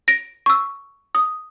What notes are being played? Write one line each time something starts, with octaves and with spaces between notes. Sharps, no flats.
A#6 D7
C#6 E6
D#6